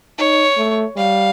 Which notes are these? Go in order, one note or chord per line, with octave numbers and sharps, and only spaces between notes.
D#4 C#5
A3
G3 F5